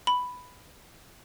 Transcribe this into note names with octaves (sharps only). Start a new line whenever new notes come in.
B5